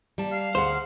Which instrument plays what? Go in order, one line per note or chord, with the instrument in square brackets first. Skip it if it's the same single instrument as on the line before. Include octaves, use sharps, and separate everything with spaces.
[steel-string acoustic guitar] G3 A#3 A5
[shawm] F5
[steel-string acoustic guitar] D2 G#4 F#5 [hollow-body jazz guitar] C5